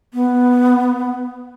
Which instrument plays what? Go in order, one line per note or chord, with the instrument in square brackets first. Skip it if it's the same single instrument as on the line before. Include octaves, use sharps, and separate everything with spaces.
[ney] B3